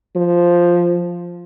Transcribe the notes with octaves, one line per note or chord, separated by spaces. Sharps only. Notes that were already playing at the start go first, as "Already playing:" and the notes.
F3